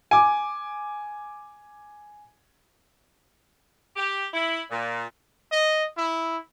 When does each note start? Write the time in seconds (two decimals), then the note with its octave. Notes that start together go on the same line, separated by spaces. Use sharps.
0.11 G#5 D6
3.96 G4
4.33 E4
4.71 A#2
5.52 D#5
5.97 E4